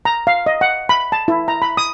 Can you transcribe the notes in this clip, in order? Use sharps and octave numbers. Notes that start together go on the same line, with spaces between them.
A#5
F5
D#5
F#5
B5
A5
E4
A#5
B5
D#6